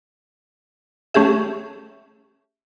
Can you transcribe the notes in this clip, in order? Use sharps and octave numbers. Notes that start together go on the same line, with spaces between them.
A3 C#4 G4 G#4 E5